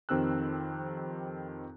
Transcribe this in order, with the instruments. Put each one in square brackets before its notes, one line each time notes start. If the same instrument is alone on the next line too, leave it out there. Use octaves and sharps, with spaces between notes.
[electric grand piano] F2 D#3 C4 G4 E6 F#6